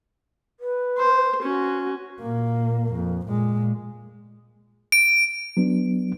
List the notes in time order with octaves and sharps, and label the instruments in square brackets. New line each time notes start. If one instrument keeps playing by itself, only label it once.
[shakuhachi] B4
[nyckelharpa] C5
[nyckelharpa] C#4 [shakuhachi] F#4
[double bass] A#2 A#3
F2
A#2 G#3
[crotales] D7
[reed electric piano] F#3 B3 D4